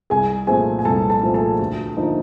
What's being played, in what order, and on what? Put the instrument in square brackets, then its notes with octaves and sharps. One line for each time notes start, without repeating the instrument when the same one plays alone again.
[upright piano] C2 G#4 G#5
A#2 F3 A3 C4 G#4 G#5
G#5
C2 A4 A5
A4 A5
A#2 F3 A3 C4
A4 A5
D2
D3 F3 A#3 D#4